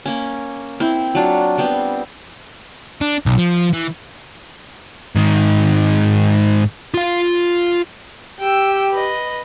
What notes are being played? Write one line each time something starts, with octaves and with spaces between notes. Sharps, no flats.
A#3 C#4
C4 E4
F#3 D4 F4
G3 B3 C4
D4
B1
F3
E3
G#2 D#3
F4 F5
G4 G5 E6
B4 D#5